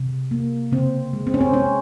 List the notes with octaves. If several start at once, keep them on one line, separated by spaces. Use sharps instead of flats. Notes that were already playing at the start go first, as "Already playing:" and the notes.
Already playing: C3
A#3
C#3 C4
G#3
C4
C#4
C4
G#3 C#4